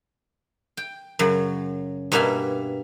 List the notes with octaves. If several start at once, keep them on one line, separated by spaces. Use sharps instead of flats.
G5
F#2 C#3 F#3
G2 B2 A#3 D4 E5 G#5